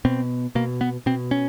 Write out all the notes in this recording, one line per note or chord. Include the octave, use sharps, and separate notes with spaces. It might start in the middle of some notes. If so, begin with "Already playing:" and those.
B2 C4
B2 A#3
B3
B2 C4
C#4